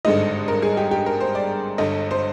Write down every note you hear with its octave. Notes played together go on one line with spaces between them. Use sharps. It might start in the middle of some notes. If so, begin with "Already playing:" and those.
G#1 G2 D3 G#3 D#4 D#5
A#4
G#4
G4
G4
A#4
C5
D5
G1 G2 D3 D#5
C5